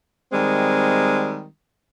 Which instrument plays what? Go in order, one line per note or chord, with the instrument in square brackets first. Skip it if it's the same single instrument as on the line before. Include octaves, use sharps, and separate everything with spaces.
[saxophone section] D#3 G3 G#3 C4